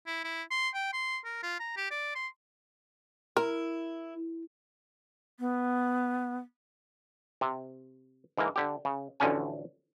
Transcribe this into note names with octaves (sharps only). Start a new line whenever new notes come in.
E4
E4
C6
G5
C6
A#4
F4
A#5
G4
D5
C6
E4 A#4
B3
C3
G#2 E3 A#3
D3 G4
C#3
A1 D2 D3 F3 C#4 G#5